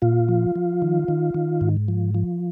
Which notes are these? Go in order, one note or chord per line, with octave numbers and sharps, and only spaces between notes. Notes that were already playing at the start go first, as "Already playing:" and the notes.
A#2 F4
F3
F3
D#3
D#3
D#3
G#2
F3
F3